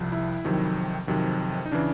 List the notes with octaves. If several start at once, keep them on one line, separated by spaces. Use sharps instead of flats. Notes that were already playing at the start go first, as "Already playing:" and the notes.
Already playing: C2 C3 F3
E4
F2 C3 D#3 F#3
F2 C3 D#3 F#3
D#4
C#3 E3 D4